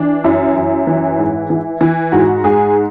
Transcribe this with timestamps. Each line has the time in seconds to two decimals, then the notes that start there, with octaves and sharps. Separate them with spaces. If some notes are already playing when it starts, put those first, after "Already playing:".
Already playing: E3 D4
0.24 F#2 E4
0.56 F#2
0.87 E3
1.18 G#2
1.50 E3
1.81 E3
2.12 G#2 F#4
2.44 G#2 G#4